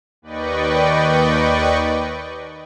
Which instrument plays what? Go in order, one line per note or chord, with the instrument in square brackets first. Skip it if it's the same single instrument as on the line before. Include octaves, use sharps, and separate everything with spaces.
[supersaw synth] D#2 B4 D5 D#5 G5 C#6